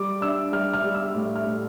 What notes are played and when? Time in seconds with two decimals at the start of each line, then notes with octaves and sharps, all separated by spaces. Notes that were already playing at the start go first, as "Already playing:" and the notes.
Already playing: G3 D6
0.21 D4 E6
0.53 G3 F6
0.73 F6
0.84 G3
0.94 E6
1.15 A2
1.36 F6
1.47 A2